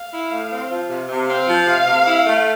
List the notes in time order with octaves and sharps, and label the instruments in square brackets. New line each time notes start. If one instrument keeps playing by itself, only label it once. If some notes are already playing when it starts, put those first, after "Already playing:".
Already playing: [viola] F5
[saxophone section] E4
A2
C4
F3
C3
C3
[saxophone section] C4 [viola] F5
[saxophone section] F3
C3
C3
E4
A3